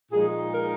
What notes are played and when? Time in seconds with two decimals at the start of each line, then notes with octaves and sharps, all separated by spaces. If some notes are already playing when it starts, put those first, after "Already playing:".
0.11 A#2 F3 G#3 D#4 G#4
0.54 A#4